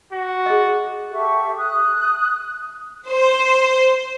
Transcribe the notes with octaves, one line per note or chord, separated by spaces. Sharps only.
F#4
G#4 D#5
G4 A4 E5 C#6
D#6 F#6
C5